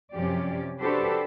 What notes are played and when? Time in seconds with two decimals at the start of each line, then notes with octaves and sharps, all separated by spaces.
0.13 F#2 C3 F3 C#4 G4 D5
0.81 D4 F#4 G4 A4 B4 C5